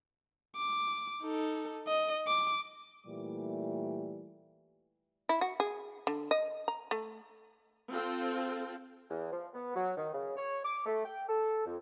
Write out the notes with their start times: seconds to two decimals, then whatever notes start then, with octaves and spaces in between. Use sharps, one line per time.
0.57 D6
1.22 D#4 A4
1.88 D#5
2.27 D6
3.06 A#2 E3 G3 A3 G4
5.29 E4
5.41 F#4
5.60 G#4
6.07 D3
6.31 D#5
6.68 A#5
6.91 A3
7.90 C4 F4 A4
9.10 E2
9.32 F3
9.54 B3
9.75 F#3
9.97 D#3
10.13 C#3
10.36 C#5
10.64 D6
10.85 A3
11.05 G5
11.29 A4
11.66 F2